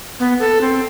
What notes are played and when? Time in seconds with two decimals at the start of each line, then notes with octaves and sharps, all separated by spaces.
0.20 B3
0.40 A4
0.61 C4